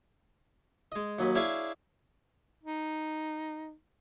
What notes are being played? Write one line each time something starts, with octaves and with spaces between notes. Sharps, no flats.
G#3 D#5
D#2 F#3 D#5 B5
D4 E4 G#4 C#5 F5 G#5
D#4